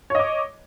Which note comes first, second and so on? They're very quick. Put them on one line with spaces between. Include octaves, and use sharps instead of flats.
C#5 D#5 D6